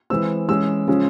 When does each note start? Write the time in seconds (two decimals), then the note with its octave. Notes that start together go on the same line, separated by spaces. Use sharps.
0.10 E3 G#3 C4 E6
0.48 E3 G#3 C#4 E6
0.87 C#3 F3 G#3 C#4